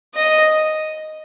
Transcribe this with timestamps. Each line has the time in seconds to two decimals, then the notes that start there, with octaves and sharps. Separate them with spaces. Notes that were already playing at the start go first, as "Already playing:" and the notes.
0.15 D#5